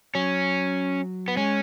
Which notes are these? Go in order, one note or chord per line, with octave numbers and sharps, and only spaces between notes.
F#3 C#4
B3
G#3 C#4